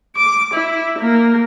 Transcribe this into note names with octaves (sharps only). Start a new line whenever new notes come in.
D6
E4
A#3